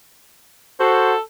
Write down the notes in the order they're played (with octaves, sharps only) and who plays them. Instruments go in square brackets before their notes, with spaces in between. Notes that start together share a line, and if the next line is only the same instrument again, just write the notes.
[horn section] F#4 C5 [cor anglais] A4